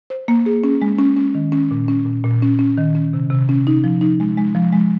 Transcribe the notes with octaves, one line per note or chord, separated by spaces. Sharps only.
C5
A#3
G#4
C#4
G#3
C#4
C#4
D#3
C#4
A#2
C#4
A#2
A#2
C#4
C#4
D#3
C#4
C3
C3
C#4
D#4
F3
D#4
G#3
G#3
F3
G#3